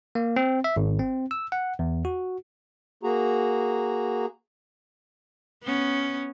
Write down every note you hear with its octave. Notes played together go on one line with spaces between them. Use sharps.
A#3
C4
E5
G#1
C4
E6
F#5
E2
F#4
A#3 F#4 G#4 A#5
B3 C#4